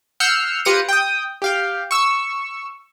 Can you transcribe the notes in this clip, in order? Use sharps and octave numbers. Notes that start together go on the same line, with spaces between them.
F#5 E6 F6 G6 C7 C#7
F4 G4 B4 A#6 C#7 D#7
G5 D#6
G4 F5 G5
C#6 E6